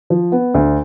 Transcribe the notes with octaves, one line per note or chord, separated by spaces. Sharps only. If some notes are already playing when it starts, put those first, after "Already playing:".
F3
B3
D2